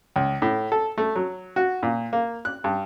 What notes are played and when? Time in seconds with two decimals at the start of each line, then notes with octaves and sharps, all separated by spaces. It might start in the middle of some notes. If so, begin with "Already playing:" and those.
0.16 C#2
0.42 A2
0.72 A4
0.98 A3
1.15 F#3
1.56 F#4
1.83 A#2
2.13 A#3
2.45 F#6
2.64 G2